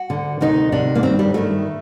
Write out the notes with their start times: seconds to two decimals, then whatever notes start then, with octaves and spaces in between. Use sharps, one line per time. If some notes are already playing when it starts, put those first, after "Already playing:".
Already playing: F#4
0.10 D2 D3
0.41 D2 C3 D#3 D#4
0.72 D2 C3 D#3 D4
0.95 A#3
1.03 G2 D#3 C4
1.19 G3
1.34 G2 D#3 A3